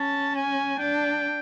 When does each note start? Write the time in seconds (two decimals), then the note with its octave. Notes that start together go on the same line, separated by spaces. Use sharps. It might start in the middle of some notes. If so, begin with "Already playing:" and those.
Already playing: C#4 A5
0.35 G#5
0.79 D4 G5